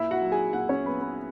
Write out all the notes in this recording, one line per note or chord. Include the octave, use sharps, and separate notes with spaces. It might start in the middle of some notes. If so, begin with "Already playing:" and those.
Already playing: A#2 E4 E5
F#4 F#5
F#3
G#4 G#5
A#2 F#4 F#5
C#4 C#5
F#3 B3 B4
B3 B4